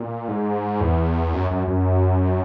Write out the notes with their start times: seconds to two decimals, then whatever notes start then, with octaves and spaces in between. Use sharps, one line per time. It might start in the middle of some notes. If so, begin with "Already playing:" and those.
Already playing: A#2
0.28 G#2
0.81 E2
1.34 F#2
1.51 F#2
1.68 F#2